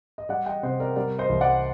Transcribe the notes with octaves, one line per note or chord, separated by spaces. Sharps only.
D#5
G3 D5 F#5
D#5 G5
C3 C5 D#5
A#4 D5
G3 A#4 D5
C5 D#5
C2
D5 F#5